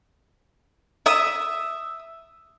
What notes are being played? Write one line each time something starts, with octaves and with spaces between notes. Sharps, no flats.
E5 D#6